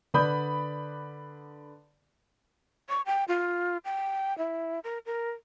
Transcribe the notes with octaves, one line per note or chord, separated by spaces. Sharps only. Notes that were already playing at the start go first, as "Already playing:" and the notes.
D3 B4 D5 B5 D#6 G6
C#6
G5
F4
G5
E4
A#4
A#4